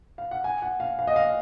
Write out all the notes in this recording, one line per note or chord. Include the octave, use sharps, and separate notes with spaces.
F5
F#5
G#5
F#5
F5
F5
D#5
F5